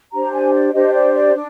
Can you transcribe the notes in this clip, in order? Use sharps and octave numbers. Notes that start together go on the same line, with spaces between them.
D4 G4 C5 A#5
G#5
D5
D4 G4 C5 D#5
D5
D5
D4